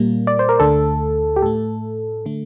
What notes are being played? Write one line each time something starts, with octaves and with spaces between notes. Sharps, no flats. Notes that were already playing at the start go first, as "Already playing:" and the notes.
Already playing: A#2 G3 A#3
D5
C5
A#4
D2 D3 A3 A4
G4
A2 A3 A4
D3 A3